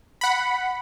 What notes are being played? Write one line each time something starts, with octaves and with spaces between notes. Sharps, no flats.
F#5 B5